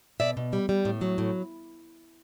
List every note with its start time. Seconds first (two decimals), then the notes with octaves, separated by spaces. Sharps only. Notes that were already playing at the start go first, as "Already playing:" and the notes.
0.20 B2 D5 E5
0.37 B2
0.53 G3
0.69 G3
0.85 A2
1.01 F#3
1.18 A2